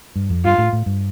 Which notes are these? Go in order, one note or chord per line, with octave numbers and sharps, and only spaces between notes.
G2
F2
G2 F4
A2
A2
G2